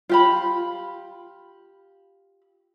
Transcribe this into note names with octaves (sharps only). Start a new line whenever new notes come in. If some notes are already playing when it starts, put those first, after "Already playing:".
F4 G4 B5